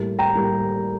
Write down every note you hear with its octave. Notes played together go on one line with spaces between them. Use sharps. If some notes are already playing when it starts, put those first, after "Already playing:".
Already playing: A2 G3 A#3
G5 A#5
A2 G3 A#3